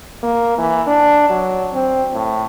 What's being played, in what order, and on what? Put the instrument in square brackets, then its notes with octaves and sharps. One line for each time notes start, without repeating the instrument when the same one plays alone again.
[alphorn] A#3
E3
D4
F#3
C4
A2